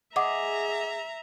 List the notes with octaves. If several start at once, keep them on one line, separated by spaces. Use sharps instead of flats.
G#4 D#5 E5 F#5 A#5 D6